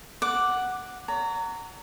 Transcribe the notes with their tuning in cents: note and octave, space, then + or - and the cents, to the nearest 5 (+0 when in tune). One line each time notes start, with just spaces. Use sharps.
F#5 +0 D6 +0
C#5 +40 A#5 -20